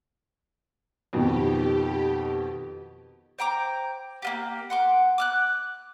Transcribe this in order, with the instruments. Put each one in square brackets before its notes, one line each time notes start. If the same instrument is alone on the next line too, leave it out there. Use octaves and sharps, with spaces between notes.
[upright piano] F2 B2 D#3 [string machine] G4
[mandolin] C5 G5 A#5 D6
A#3 F4 G4
F#5 C6 D6
D6 F6 F#6